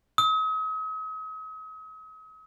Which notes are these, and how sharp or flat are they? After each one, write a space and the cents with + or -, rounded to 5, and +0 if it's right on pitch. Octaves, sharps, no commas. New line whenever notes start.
D#6 +40